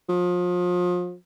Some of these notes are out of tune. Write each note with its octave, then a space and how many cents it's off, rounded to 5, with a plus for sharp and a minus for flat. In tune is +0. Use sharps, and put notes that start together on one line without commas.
F3 +35